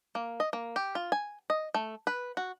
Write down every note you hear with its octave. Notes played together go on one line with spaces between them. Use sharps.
A#3
D#5
A#3
G4
F4
G#5
D#5
A3
B4
F#4